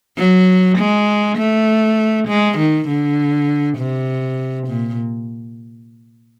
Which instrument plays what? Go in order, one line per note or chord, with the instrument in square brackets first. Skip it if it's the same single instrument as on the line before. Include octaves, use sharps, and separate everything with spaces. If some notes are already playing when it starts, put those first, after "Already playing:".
[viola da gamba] F#3
G#3
A3
G#3
D#3
D3
C3
A#2